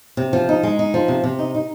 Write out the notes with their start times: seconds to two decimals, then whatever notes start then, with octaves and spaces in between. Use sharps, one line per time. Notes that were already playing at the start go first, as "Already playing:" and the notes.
0.17 C3
0.33 F3
0.49 D#4
0.63 G#3
0.79 D#4
0.94 F3
1.08 C3
1.24 C3
1.39 D#4
1.55 D#4